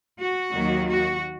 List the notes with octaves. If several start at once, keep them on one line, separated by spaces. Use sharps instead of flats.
F#4
D#2 D#3 F#3 A#3
F#4